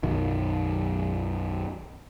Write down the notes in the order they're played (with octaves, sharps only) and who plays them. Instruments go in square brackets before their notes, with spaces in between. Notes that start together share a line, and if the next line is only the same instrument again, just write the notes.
[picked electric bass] B1 F#2 D#3